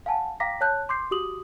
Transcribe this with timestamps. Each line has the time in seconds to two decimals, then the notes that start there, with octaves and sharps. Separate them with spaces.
0.06 F5 F#5 G#5 A5
0.40 F5 G5 A#5 D6 A#6 B6
0.61 C#5 A5 F#6 G6
0.89 C6 D6 G6 C7
1.11 F#4 G4 D6 D#6 F#7